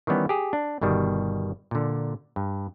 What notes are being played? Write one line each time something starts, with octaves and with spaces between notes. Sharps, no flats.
D#3 E3 G3 B3 C#4
G4 G#4
D4
G1 B2 D#3 G3
A#2 D3
G2